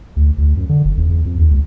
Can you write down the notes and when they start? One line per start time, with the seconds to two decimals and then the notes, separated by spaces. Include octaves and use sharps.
0.16 D2
0.38 D2
0.57 F#2
0.69 D3
0.85 F#1
0.97 E2
1.10 E2
1.25 F2
1.38 D#2
1.51 C#2